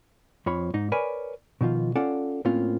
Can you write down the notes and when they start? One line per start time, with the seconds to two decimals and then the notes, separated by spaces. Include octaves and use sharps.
0.46 F2 F3 C#5 B5
0.74 G#2 D#4
0.92 A#4 B4 C#5 D5 G#5 B5
1.61 B2 D#3 F3 F4
1.96 C#4 F4 A4 D5 F5 F#5
2.45 A2 A#3 C4 C#4 F4